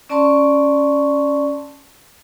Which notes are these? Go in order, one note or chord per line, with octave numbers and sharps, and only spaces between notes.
C#4 D5 A5 C6 C#6